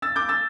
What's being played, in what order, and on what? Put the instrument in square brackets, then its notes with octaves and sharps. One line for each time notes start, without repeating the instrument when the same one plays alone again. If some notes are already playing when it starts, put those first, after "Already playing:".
[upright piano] E6 A6
D6 G6
E6 A6